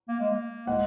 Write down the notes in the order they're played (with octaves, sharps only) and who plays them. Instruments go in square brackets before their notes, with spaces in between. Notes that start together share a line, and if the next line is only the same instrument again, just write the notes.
[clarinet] A#3
G#3
A#3
[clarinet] G#3 [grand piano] F#5